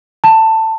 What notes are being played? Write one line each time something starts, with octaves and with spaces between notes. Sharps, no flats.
A5